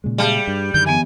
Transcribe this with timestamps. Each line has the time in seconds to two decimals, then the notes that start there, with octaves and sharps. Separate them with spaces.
0.04 A#2 C#3 G#3
0.18 G3 G#4 F5 A5
0.48 G2
0.74 F#2 D3 D#3 G6
0.86 E3 B3 G#5